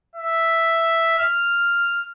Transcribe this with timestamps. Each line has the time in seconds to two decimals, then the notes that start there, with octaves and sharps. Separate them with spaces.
0.16 E5
1.18 F6